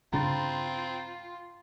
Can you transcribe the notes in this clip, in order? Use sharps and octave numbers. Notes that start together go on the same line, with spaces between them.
G2 C#3 C4 D4 F4 A#5 B5 A6